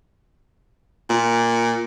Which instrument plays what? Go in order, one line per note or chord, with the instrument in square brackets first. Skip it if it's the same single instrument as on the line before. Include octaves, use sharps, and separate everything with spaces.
[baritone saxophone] A#2